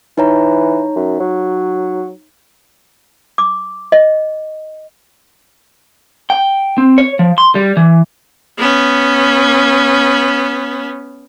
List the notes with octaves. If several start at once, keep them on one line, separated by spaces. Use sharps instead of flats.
E3 D#4 C#5 A#5
F#2
F#3
D6
D#5
G5
C4
C#5
F3
C6
G3
E3
B3 C#4